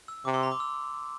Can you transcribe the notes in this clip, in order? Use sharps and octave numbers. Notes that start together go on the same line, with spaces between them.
E6
C3 D6
C6
A#5
D6
E6